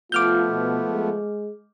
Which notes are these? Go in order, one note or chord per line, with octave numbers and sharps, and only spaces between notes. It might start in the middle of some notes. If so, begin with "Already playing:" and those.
F3 A3 B3 F4 D6 F6 G6
B2
G#3